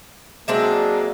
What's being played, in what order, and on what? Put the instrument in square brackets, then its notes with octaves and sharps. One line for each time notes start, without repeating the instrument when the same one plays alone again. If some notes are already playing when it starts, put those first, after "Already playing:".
[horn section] F#3 G#3 A#3 [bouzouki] C4 D4 E5